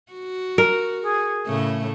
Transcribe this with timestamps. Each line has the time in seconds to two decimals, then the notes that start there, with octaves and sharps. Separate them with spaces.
0.12 F#4
0.58 A#4
1.02 G#4
1.46 A2 C#3 A3